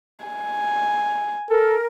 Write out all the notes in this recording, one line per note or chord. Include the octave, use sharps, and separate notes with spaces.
G#5
A4 A#4